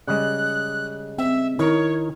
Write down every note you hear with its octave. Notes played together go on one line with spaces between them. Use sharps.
C#3 G3 G#3 F#6
C4 E5
D#3 E4 A#4 C#5